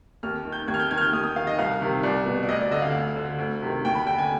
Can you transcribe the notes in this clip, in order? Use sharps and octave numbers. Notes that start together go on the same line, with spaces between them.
D#2 F6
D#3
G6
D#2 G#6
F6
G6
D#3 G#6
F6
G6
D#2 D#6
D#6
D#3 F5
D#5
C2 F5
C3 D#3
C2 D5
B2
D5
D2 D#5
D5
D3 D#5
F5
D2
D3
D2
C3 D#3
D#2 G5
B5
D3 G5
G#5